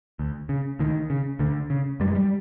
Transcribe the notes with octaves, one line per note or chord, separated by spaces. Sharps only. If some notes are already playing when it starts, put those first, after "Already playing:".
D2
C#3
D2 D#3
C#3
D2 D3
C#3
F#2 G3
G#3
G3